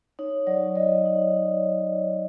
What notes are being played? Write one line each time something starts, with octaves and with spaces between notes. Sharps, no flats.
D#4 C#5
F#3 D5
F#3 D#5
D#4